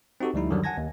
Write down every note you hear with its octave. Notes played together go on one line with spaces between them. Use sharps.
C4 D#4 F#4 G4 A4
D2 F3 G3 D#4 E4
F#2 D3 D#3 F#3 G3
F#5 G#5 A5 G#6 A#6
D#2